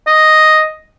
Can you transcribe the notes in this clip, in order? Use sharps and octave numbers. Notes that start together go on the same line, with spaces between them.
D#5